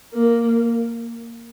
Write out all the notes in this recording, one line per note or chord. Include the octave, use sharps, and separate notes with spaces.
A#3